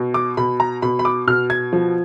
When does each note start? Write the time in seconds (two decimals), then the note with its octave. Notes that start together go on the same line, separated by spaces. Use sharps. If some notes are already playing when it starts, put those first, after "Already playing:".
Already playing: B2
0.14 D6
0.37 B2 B5
0.60 A#5
0.82 B2 B5
0.99 B5
1.05 D6
1.27 B2 F6
1.50 G#6
1.73 F3